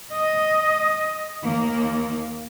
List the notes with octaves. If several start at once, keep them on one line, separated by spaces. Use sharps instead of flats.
D#5
D#2 A#3